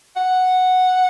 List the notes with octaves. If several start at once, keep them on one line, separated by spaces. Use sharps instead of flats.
F#5